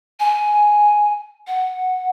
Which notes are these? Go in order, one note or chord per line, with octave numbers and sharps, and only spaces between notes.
G#5
F#5